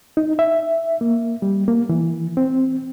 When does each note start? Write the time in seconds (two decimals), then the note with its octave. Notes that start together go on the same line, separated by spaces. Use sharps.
0.17 D#4
0.39 E5
1.01 A#3
1.42 G3
1.68 A#3
1.89 E3
2.37 C4